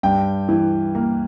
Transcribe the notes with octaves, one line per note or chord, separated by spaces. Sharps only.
G2 G5
E3
A#3